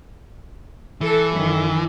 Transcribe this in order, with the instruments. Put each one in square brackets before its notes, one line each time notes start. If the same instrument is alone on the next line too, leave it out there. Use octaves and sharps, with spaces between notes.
[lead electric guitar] E3 [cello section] A4
[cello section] F#2 D#3